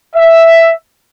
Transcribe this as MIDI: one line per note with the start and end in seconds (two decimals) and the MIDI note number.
0.16 0.73 76